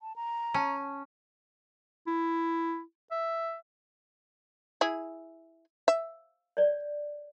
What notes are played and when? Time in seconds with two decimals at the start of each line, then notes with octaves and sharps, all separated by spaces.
0.01 A5
0.16 A#5
0.54 C#4 A5
2.07 E4
3.11 E5
4.81 E4 G#4
5.88 E5
6.57 C#5 D5